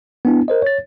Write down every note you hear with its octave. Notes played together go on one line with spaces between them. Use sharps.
B3 D4 E4
A#4 C5 D#5
C#5 A6